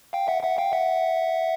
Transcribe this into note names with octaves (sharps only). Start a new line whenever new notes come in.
F5 G5
E5 F#5
E5 F#5
F5 G5
E5 F#5